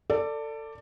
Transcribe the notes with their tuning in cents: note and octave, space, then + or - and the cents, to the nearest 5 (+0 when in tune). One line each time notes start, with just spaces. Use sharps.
A4 +25 D5 +0